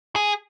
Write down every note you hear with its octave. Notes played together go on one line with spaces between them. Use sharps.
G#4